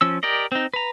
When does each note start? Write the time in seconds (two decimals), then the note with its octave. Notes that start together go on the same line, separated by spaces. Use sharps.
0.01 F3 C#4 E6
0.23 G4 A#4 D5 D#5
0.52 C4 D#4
0.74 B4 A#5